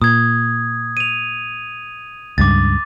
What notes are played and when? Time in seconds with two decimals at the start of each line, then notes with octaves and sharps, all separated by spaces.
0.02 A#2 D#6 G#6
0.97 D#7 F7
2.38 C#2 G2 D6 A6